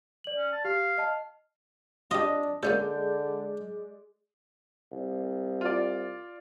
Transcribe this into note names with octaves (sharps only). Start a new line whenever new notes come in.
D5 F#7
C#4
A5
G4 F5
D#5 A5 C7
D4 F4 G4 D#5
D3 G#3 A#3 C#4 A4 D5 G6
C2
F4 D5